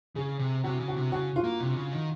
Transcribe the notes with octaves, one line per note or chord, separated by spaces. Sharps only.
C#3 G#4
C3
C3 F#4
C#3
F#4
C3
C#3 F#4
F4
A#3
C3
C#3
D#3